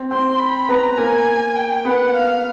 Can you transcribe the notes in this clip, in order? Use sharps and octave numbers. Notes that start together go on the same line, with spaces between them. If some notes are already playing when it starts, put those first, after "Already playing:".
Already playing: C4
C4 C5 C6
B5
B3 B4 A#5
A#3 A#4 G#5
G5
B3 B4 F#5
F5